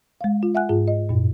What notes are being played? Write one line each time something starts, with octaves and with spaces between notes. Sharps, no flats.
G#3 F5
F4
E5 F#5 G#5 F#6
G#2 F4 G#4
D#5
F#2 A#2